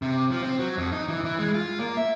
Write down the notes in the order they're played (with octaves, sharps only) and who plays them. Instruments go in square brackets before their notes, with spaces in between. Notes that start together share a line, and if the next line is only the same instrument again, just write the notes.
[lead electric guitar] C3
F3
C4
F#3
F2
D#4
E3
E3
G#3
F4
A#3
E5